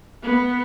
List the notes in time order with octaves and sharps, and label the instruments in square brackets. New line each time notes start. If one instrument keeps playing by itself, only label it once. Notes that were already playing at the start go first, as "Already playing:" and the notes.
[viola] B3